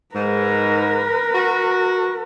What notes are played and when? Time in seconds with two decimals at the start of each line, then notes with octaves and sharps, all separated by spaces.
0.15 G#2 A#4 B4
1.34 F#4